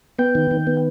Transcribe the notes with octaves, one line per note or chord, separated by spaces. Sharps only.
B3 G5
D#3
D#3
B3